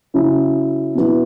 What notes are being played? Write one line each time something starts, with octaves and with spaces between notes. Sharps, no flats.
C#3 F#3 C#4 E4
B2 F#3 B3 E4